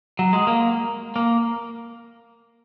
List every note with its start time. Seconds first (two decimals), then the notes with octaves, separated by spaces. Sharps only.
0.19 F#3
0.33 G#3
0.47 A#3
1.16 A#3